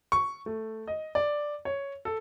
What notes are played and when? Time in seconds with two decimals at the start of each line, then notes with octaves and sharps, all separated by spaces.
0.12 C#6
0.46 A3
0.87 D#5
1.15 D5
1.65 C#5
2.05 A4